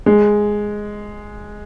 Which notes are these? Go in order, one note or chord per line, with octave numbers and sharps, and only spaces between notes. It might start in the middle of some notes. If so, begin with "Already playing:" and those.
G#3